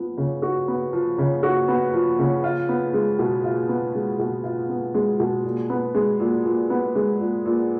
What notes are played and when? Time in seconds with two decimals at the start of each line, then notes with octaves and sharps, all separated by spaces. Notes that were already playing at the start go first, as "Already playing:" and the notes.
Already playing: F3 B3
0.17 C#3
0.42 F#4
0.68 B3
0.93 F3
1.18 C#3
1.43 F#4
1.68 B3
1.94 F3
2.19 C#3
2.44 F4
2.69 B3
2.94 G#3
3.19 B2
3.44 F4
3.69 B3
3.95 G#3
4.19 B2
4.44 F4
4.69 B3
4.95 G#3
5.20 B2
5.45 A#2
5.70 B3
5.95 G#3
6.20 A#2
6.45 A#2
6.70 B3
6.95 G#3
7.20 A#2
7.45 A#2